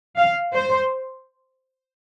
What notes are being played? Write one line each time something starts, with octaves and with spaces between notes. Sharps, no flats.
F5
C5